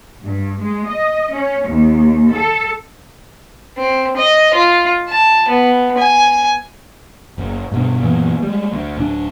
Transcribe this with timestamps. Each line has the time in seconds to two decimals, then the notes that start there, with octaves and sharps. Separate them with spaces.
0.24 G2
0.61 G#3
0.89 D#5
1.32 C#4
1.67 D#2
2.31 A4
3.77 C4
4.17 D#5
4.54 F4
5.09 A5
5.49 B3
5.98 G#5
7.38 F#1
7.72 G2 B2 D3
8.02 F#2 A#2 E3 B3
8.43 G3 G#3
8.73 D2
8.97 D1 D4